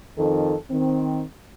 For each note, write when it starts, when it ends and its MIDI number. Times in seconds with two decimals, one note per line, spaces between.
0.18 0.55 41
0.18 0.55 51
0.18 0.55 69
0.71 1.22 51
0.71 1.22 60